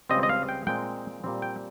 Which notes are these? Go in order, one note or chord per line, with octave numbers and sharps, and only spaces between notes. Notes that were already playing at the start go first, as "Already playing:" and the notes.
C#2 C#3 G3 C4 D#5
D#5
F5
G5
A#2 G#3 C4 G5
A#2 G3 C4
G5